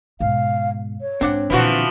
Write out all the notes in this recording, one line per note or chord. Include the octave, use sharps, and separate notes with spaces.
G#2 B2 F5
C#5
G#2 C4 D4 F#5
A#2 D3 E3 F3 F#4